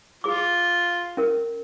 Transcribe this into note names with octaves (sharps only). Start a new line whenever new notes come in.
F4 G#4 D6
C#4 A#4